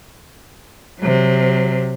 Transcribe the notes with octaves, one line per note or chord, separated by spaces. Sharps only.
C3 F#3